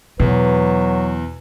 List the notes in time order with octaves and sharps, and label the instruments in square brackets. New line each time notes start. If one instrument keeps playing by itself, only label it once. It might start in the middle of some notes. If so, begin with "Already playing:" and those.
[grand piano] E2 [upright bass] B2 [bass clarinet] F#3 [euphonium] B4